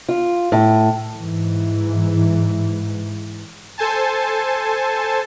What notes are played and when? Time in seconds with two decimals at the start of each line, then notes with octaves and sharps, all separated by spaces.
0.09 F4
0.52 A2
1.16 G#2 E3
3.78 A4 C5 G#5 A5